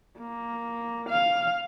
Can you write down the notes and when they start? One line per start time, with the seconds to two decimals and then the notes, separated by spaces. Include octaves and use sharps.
0.18 A#3
1.09 F5